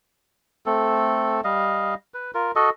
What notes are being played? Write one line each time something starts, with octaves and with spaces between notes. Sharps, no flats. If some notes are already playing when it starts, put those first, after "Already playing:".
A3 C4 A4
G3 D#5 F5
B4
F4 A#4
F#4 A4 D#5